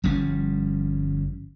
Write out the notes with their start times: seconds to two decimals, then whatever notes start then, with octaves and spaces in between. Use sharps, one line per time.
0.04 G1 F3 G3 C#4